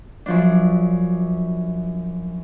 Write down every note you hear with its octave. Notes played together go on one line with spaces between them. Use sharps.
F#2 F3 D4